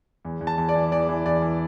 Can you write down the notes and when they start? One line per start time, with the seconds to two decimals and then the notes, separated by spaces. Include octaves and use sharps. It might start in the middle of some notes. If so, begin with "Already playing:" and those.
0.25 E2
0.41 E2
0.47 A5
0.58 E2
0.69 D5
0.75 E3
0.92 E2 D5
1.09 E3
1.26 E2 D5
1.42 E3